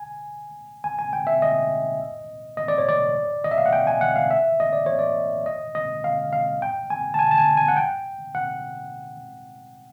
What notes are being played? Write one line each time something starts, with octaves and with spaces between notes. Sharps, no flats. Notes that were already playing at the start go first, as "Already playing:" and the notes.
Already playing: G#5
G#5
G#5
G5
E5
D#5
D#5
D5
C#5
D5
D#5
E5
F5
F#5
G5
G#5
F#5
F5
E5
D#5
D5
C#5
D5
D#5
D#5
F5
F5
G5
G#5
A5
G#5
A5
G#5
G#5
F#5
G5
F#5